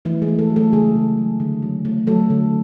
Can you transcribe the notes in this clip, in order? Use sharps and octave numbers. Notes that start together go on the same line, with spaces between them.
E3 A3 E4
G#3 G#4
A3
A3 A4
F#3
A3 A4
C#3 G#3 G#4
C#3
F#3
D3
F#3
A3
F#3 A3 A4
D3